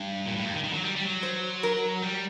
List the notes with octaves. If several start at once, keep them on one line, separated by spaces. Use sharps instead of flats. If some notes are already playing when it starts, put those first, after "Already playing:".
Already playing: G2
A#2
A2
G2
D#3
D#3
F#3
G3
G3
F#3
C5
A#4
G3